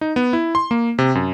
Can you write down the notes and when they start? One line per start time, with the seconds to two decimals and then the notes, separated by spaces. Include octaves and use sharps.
0.01 D#4
0.16 B3
0.33 E4
0.55 C6
0.71 A#3
0.99 C3
1.15 F#2